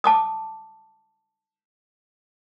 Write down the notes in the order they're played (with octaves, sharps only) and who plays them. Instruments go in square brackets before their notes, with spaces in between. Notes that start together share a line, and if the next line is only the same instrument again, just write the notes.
[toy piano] A5 D6 D#6